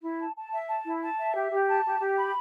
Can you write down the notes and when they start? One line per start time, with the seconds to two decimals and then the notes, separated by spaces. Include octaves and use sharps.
0.02 E4
0.19 A5
0.36 A5
0.52 E5
0.69 A5
0.85 E4
1.02 A5
1.19 E5
1.35 G4
1.52 G4
1.68 A5
1.85 G4
2.01 G4
2.18 B5